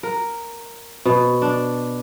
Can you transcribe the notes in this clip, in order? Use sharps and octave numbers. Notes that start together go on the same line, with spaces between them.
A#4
B2
D4